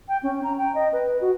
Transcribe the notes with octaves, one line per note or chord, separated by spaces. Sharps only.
G5
C#4
A#5
G5
D#5
B4
F#4